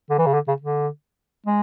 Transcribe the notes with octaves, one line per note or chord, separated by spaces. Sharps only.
D3
E3
C#3
D3
C#3
D3
G#3